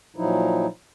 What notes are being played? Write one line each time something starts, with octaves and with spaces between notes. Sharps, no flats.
A#2 F3 F#3 D#4 E4